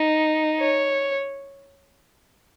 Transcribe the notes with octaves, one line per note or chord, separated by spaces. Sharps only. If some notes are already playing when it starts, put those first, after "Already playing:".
Already playing: D#4
C#5